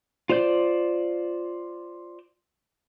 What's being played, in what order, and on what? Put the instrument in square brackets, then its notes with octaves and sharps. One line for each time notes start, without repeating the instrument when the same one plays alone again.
[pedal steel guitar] F4 C5 D5 G6